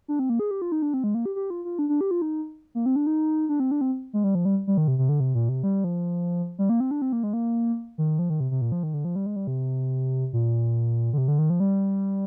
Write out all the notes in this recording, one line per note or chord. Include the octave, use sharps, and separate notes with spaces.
D4
C4
A#3
G#4
G4
F4
D#4
D4
C4
G#3
A#3
G4
G4
F4
F4
D4
D4
G4
F4
D#4
A#3
C4
D4
D#4
D4
C4
D4
C4
G#3
G3
F3
G3
G3
D#3
C3
C3
D3
C3
A#2
C3
G3
F3
G3
A#3
C4
D4
C4
A#3
G#3
A#3
D#3
F3
D#3
C3
C3
A#2
F3
D#3
D3
F3
G3
G#3
G3
C3
A#2
D3
C3
D3
D#3
F3
G3